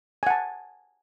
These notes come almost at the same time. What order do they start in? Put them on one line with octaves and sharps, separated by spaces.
G#5 F#5 A5